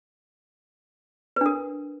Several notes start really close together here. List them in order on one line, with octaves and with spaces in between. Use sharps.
B4 D4 A#4